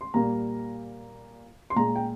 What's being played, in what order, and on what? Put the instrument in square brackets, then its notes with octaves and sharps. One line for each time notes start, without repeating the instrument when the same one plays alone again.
[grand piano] C6
A#2 G3 A#3 A#5
C6
A#2 G#3 A#5
G5